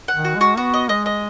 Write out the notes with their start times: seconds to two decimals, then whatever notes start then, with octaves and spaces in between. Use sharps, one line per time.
0.08 F#5
0.14 D#3
0.25 F#4
0.35 G#3
0.41 F#4
0.57 B3 F#4
0.74 D#5
0.89 G#3 D#5
1.06 D#5